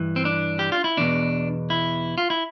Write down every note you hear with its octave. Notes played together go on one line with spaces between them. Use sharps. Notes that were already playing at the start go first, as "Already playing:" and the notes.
Already playing: G2 E3
C4
D4
G4
F4
E4
E2 B2 D4
E4
F4
E4